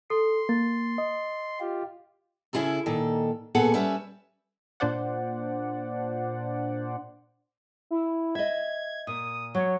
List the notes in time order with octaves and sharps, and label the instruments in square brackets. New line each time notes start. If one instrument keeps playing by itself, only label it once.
[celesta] A4 [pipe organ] C6
[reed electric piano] A#3 [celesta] A6
[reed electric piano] D#5
[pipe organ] F4 G4
[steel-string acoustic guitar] C#3 C#4 E4 F4 G#4 A4
A#2 D#3 A4
D#2 A#2 B3 G#4 A4 F#5
G3 C#4 B4 E5
[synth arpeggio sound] A#2 D4 C5 D5 F#5
[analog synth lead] E4
[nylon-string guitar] D#5 E5 [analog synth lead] G#6
[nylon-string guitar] A#2 [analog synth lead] D#6
[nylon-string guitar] F#3 [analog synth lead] C#5